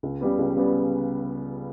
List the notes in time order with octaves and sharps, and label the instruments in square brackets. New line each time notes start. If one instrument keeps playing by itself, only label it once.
[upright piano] C#2
C#3 G3 B3
C#2
C#3 G3 B3